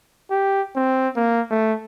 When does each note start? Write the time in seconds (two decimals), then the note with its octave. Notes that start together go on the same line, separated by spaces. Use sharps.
0.30 G4
0.76 C4
1.16 A#3
1.51 A3